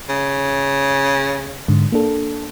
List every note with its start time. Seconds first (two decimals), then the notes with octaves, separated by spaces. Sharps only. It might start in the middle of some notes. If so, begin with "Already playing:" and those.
0.09 C#3
1.68 G#2 D3
1.92 A#3 D4 A4